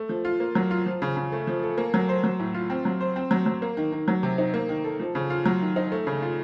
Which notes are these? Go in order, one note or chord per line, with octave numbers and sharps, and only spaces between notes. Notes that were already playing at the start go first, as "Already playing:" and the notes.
Already playing: A3
F3
F4
A#3
F#3
F4
F3
C#3
C#3
A3
F3
A4
A#3
F#3
C5
F#3
A2
F4
C4
F#3
C5
C4
F#3
F#3
A#3
D#3
D#3
F#3
C3
D#4
A#3
D#3
A4
F3
C#3
F4
F#3
D#3
D#4
A3
C#3
F4